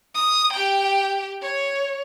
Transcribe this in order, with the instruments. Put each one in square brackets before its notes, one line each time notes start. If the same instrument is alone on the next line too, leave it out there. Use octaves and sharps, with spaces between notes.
[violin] D#6
G4 G5
C#5